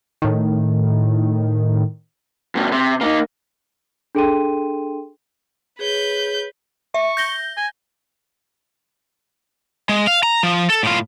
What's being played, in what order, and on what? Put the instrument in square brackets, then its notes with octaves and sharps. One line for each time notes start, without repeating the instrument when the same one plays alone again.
[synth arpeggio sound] A2 D#3
[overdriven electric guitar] G2 B2
C3
A#3 D#4
[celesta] D4 G#4 A4 G5 C6 D#7
[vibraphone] G#4 C#5 [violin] B4 G6
[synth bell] E5 [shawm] C#6
[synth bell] G6 A#6 G7
[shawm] G#5
[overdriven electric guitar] G#3
F5
A#5
F3
A4
A2 F4